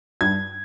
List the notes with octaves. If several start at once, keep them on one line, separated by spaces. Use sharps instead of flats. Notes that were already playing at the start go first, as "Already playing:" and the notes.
G2 G#6